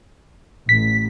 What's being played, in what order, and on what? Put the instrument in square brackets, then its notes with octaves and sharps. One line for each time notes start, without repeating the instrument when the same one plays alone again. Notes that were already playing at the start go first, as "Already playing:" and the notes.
[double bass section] A1 [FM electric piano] B6